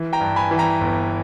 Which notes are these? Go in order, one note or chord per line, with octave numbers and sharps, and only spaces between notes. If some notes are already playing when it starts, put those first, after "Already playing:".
Already playing: E3
G5 A#5
G2
G#5 B5
E3
G5 A#5
G1